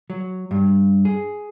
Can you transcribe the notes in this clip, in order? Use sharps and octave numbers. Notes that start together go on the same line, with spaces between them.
F#3
G2
G#4